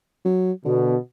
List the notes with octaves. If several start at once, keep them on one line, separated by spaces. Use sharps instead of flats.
F#3
B2 D3